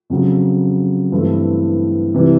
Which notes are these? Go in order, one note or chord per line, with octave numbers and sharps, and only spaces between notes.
F2 C#3 F#3
G2 E3 A3 C4 E4
C3 E3 G3